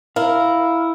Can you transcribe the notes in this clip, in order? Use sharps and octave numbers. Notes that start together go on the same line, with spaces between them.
E4 A#4 F5